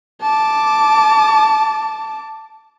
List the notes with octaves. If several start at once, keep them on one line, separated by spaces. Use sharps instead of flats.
A5 D6